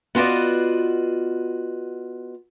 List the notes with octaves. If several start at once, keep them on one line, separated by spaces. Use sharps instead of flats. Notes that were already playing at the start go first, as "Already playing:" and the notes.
B3 F4 F#4 D5 D#5